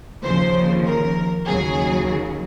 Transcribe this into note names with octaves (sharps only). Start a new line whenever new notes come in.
D#2 C#3 F3 C5
A#4
D#2 C#3 F#3 G#4